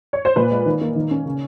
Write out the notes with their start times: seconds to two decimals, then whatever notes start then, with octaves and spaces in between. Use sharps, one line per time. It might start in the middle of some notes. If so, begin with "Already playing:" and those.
0.13 C#5
0.25 C5
0.36 A#2 B4
0.51 G#3
0.66 D#3
0.81 A#3
0.95 D#3
1.11 C#4
1.26 C#3